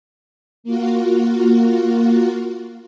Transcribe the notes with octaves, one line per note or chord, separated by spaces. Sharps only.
A#3 F4 F#4